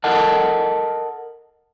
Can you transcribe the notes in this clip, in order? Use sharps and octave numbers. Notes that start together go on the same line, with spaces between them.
A4 A#4 D#5 F#5 A5